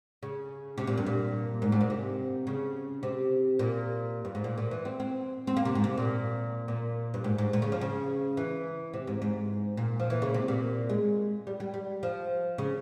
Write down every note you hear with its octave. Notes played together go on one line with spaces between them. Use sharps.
C#3
C3
A#2
G2
A#2
G#2
G#2
A#2
C3
C#3
C3
A#2
G2
G#2
A#2
A#2
E3
C4
C4
C4
A#3
C3
G#2
C3
A#2
A#2
G2
G#2
G#2
A#2
C#3
F3
C#3
E3
C3
G#2
G#2
A#2
F3
E3
C#3
C3
A#2
G#3
G3
G3
G3
F3
C#3